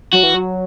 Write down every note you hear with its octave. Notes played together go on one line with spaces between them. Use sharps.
F#3 F#4
E3
F#3